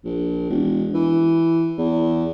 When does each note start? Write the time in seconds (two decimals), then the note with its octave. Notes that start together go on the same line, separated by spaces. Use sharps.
0.05 A#1
0.49 E1
0.95 E3
1.78 E2